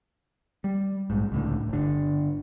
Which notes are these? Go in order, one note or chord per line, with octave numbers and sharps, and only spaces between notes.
G3
A#1 G#2
C#2 A2 D3
G1 D3